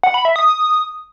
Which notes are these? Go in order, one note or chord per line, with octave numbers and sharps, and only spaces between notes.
F#5
B5
E5
D#6